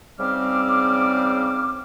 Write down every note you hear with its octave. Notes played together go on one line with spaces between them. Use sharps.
G#2 C#3 G3 C4 D6 F6